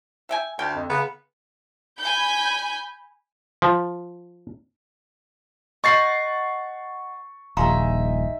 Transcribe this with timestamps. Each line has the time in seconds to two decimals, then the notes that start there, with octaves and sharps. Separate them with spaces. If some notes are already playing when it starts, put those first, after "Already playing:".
0.29 E5 G5 G#5
0.59 D2 G5
0.76 F2
0.90 C#3 B3
1.99 G#5 B5 G6
3.62 F3
5.84 D#5 F#5 C#6 G6 A6 C7
7.57 D#1 A#1 D#4 G#4 E5 F5 A#5 C6